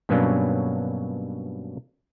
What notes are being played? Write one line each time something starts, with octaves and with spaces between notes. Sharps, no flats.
G2 B2 F#3 A#3 C#4 D4